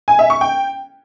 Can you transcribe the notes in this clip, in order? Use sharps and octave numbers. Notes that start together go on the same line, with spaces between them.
G#5
E5
C#6
G5